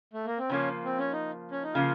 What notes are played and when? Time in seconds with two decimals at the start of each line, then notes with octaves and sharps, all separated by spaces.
0.13 A3
0.26 A#3
0.38 C4
0.49 C#3 F3 A#3 C#4
0.85 C4
0.98 C#4
1.13 D#4
1.51 C#4
1.63 D#4
1.74 C#3 F3 A#3 F4